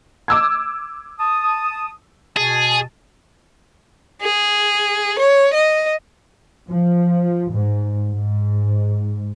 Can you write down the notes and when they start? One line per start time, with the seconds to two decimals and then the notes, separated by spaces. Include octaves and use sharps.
0.28 D6 E6 G#6
1.20 A5 D#6
2.37 B2 G#4 A5
4.22 G#4
5.19 C#5
5.54 D#5
6.71 F3
7.52 G#2
8.10 G#2